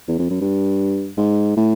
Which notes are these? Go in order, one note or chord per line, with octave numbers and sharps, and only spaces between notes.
E2
F2
F#2
G2
G#2
A2